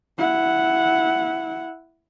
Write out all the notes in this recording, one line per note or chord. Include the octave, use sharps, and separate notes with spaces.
E4 F#5